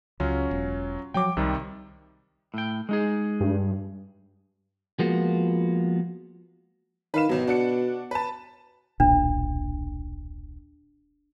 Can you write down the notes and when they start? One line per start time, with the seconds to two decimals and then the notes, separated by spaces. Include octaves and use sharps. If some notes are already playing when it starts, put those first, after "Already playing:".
0.20 C#2 F#3 C#4 F4
0.51 E1
1.14 F3 F#3 G5 D6
1.37 C2 C3 D#3 G3
2.54 A2 G5
2.89 G#3 D#4 G#4
3.40 G2
4.99 F3 G#3 A#3 B3 F4 F#4
7.14 D#3 B4 F5 E7
7.29 G#1 B2 F#3
7.47 D4 F#4 C#7
8.11 B4 A5
9.00 D#1 B1 A#2 D4